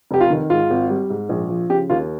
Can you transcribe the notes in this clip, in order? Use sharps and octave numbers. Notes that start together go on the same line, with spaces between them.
F1 G4
F4
D#3
G#2 F4
G#1
G3
G#2
A#1
F3
C#3 G4
D#2 F4